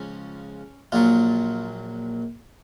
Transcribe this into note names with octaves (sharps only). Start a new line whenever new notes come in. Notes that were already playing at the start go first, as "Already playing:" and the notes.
Already playing: C#2 C#3 F3 C#4
A#1 A#2 F#3 F4